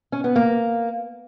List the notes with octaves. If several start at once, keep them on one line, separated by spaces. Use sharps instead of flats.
C#4
B3
A#3